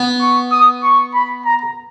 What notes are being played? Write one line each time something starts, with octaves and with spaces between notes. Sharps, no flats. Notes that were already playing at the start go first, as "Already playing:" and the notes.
Already playing: B3
C#6
D#6
C#6
B5
A#5